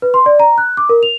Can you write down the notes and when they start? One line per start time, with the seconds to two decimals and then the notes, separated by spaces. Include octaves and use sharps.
0.02 B4
0.14 C6
0.26 D5
0.40 A#5
0.58 F#6
0.77 D6
0.89 A#4
1.03 F7